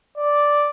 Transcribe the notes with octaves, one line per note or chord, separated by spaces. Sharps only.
D5